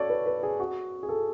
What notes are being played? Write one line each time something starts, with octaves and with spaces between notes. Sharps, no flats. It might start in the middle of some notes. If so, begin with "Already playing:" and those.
Already playing: F#4 A4 C#5 D5
B4
B4
G#4
F#4
G#4
A4